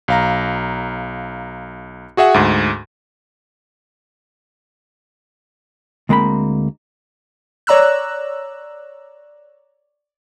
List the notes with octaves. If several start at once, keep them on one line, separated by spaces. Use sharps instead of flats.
B1 F5 A#5
F#4 G#4 E5 F#5
D2 G#2
D2 G#3 A#3 C4 B5
C#5 D5 A#5 E6 F#6